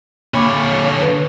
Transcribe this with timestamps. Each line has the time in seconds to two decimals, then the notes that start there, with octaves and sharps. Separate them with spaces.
0.34 D3 A#3 C#5 B5 D6
1.01 B4